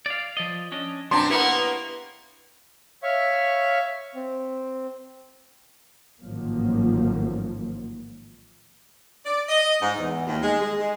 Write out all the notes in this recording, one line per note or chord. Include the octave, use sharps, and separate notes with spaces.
D5 F5
F3 D5 D#5
C#4 D4 D#5
F#2 B2 B3 C4 D4 A#5 C6
A#3 B3 E4 G4 C#5 F#5
C#5 E5 F5 C#6
C4
A1 G#2 D#3 F3 F#3 A#3
D5
D#5
G#2
E2
D#2
G#3
G#3
G#3